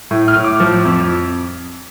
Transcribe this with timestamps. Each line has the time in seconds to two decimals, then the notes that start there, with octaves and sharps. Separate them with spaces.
0.11 A2
0.28 F6
0.36 A2
0.44 D6
0.60 F3
0.85 F2